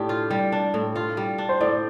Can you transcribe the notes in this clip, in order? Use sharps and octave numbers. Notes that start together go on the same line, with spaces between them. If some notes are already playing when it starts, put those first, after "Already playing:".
Already playing: A2 D4 G4
F4
G3
D4
A2
F4
G3
D4
C5
A2 D5